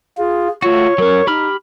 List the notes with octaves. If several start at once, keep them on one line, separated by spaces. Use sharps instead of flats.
F4 G#4
A3 F4 F#4 C#5
F#3 C#4 A#4
D#4 G4 B5 F6